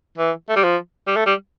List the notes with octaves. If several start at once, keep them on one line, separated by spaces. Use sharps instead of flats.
E3
A3
G3
F3
G3
A3
G3